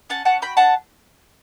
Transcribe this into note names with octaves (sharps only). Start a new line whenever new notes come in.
C#4 F#5 A5
C#4 F#5 A5
F#4 G5 B5
D4 F#5 A5